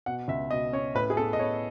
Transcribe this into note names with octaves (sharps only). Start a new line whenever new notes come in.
B2 F#5
C#2 E5
B2 D#5
C#4 C#5
A2 B4
G#4
B3 A4
D#5
B3 C#5